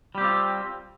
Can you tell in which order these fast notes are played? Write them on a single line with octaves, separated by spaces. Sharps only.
G3 G4 C4 F4